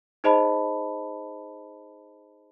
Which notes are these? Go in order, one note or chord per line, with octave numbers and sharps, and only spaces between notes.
D#4 G#4 C5 D#5 A5 B5